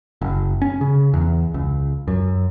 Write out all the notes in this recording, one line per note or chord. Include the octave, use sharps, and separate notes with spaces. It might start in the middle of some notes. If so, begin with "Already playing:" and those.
F#1
C#4
C#3
E2
C#2
F#2